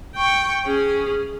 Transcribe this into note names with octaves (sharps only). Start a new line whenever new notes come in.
G5 C#6
C#4 G#4